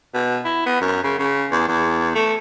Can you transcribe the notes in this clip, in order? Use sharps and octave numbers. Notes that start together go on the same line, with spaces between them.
B2
E4
B3
F#2
C#3
C#3
E2
E2
A3